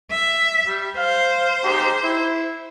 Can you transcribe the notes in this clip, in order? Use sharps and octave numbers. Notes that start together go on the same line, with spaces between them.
E5
G3
C5 F5
D#4 G4 G#4
E4